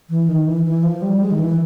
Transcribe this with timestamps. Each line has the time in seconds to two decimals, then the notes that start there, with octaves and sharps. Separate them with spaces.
0.10 E3
0.28 D#3
0.47 E3
0.65 E3
0.83 F3
1.02 G3
1.21 G#3
1.31 D#3
1.39 E3